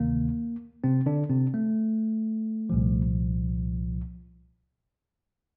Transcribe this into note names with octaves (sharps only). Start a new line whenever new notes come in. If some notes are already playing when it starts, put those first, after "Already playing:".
Already playing: D2 C3 D#3 A#3
C3 C4
D3 D4
C3 C4
A3
C2 A#2 F3